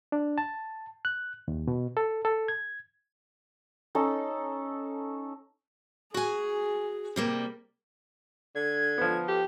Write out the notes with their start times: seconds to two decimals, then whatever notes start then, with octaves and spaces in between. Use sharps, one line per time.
0.12 D4
0.38 A5
1.05 F#6
1.48 D#2
1.67 B2
1.97 A4
2.25 A4
2.48 G#6
3.95 C#4 D#4 A4
6.14 F#4 G#4 G#5
7.16 C3 G3 A#3
8.55 D3 G#6
8.98 F3 B3
9.28 G4 A4